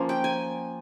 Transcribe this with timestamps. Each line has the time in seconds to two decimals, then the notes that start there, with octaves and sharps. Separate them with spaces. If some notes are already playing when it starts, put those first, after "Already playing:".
Already playing: F3 A#3 C#4
0.09 G5
0.24 G#5